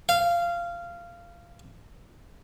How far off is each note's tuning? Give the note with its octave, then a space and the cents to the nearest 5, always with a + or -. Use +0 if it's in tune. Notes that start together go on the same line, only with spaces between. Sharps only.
F5 -15